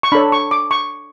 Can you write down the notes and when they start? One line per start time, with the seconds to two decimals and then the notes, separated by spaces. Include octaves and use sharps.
0.03 C#6
0.12 D4 A4 C#5 B5
0.32 C#6
0.51 D6
0.71 C#6